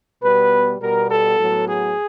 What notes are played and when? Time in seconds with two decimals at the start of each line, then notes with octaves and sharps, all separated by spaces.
0.22 B2 G3 B3 B4
0.80 B2 G3 B3 A#4
1.10 A4
1.39 A2 F#3 B3
1.67 G#4